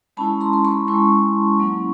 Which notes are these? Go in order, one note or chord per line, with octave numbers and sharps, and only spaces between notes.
G#3 C#4 E4 A5 B5
A#5 C6
C6
B5 C#6
G#3 C#4 E4 B5 C#6
F#3 A#3 C#4 E4